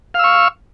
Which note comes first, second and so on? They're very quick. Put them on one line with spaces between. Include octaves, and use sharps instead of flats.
F5 E6 C#6